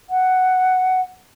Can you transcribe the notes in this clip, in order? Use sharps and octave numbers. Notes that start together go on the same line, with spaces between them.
F#5